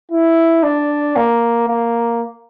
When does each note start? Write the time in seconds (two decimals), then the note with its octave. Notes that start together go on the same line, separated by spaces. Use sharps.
0.11 E4
0.63 D4
1.16 A#3
1.68 A#3